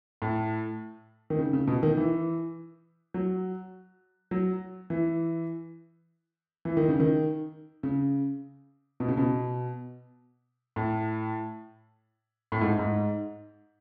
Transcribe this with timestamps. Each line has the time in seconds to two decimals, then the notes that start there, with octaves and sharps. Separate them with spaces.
0.22 A2
1.30 D#3
1.39 C#3
1.53 C#3
1.67 B2
1.83 D#3
1.97 E3
3.14 F#3
4.31 F#3
4.90 E3
6.65 E3
6.77 D#3
6.88 C#3
7.00 D#3
7.83 C#3
9.00 B2
9.08 C#3
9.17 B2
10.76 A2
12.52 A2
12.61 G#2
12.79 G#2